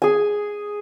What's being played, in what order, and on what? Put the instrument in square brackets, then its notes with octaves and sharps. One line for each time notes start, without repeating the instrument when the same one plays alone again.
[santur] G#4 G#5